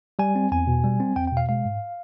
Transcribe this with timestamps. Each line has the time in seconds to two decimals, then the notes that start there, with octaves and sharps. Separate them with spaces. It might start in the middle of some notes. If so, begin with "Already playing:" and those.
0.19 G3 G#5
0.35 C4
0.52 E2 G#5
0.67 B2
0.84 G3
1.00 C4
1.16 E2 G5
1.27 B2 G5
1.37 F5
1.49 G#3 F5
1.65 G#2